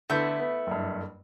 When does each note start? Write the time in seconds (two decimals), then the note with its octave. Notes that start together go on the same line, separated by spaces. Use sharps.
0.10 D3 A3 B3 E4 G6
0.39 B3
0.67 F#1 G2